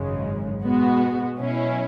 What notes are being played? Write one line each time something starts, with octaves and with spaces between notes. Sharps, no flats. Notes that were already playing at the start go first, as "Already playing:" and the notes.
Already playing: G#1 F#2 C#3 G#3
B2 G#3 B3 F#4
B2 F#3 C#4 E4